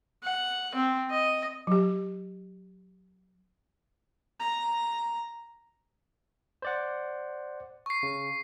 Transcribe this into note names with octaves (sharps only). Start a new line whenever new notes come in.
F#5
C4
D#5
F#3 G4
A#5
C5 D5 F#5
C#6 C7
C#3